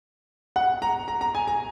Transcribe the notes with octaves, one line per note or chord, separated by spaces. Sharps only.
F#5
A#5
A#5
A#5
G#5
A#5